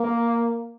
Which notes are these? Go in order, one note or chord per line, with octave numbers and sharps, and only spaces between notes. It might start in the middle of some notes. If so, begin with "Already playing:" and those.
Already playing: A#3